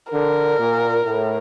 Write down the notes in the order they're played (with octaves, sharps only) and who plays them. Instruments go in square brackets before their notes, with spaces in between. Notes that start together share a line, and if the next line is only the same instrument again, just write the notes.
[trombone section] D3 [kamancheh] A#4
[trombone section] A#2
A2